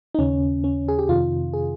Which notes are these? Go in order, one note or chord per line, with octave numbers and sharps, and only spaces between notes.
D#4
D#2 C#3 C#4
C#4
G#4
G4
F2 C3 D#3 F4
G#4